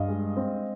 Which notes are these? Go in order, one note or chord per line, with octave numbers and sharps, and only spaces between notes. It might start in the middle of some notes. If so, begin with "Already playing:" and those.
Already playing: G2 D#5 F5
G#3
C4